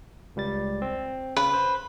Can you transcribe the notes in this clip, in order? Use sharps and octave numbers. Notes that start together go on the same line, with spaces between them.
C#2 G3 A6
C4
C#3 B4
C5